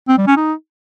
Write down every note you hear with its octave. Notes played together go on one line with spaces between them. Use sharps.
C4
G3
C#4
D#4